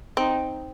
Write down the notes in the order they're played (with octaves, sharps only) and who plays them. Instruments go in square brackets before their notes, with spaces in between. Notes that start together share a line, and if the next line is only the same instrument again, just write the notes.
[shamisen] C4 [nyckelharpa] D#4